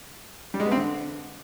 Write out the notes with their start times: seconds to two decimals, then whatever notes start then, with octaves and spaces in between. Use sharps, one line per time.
0.54 G3
0.60 G#3
0.66 B3
0.71 C4
0.77 D3